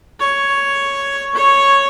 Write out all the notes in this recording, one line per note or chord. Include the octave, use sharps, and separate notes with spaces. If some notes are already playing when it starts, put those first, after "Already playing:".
C#5
C#5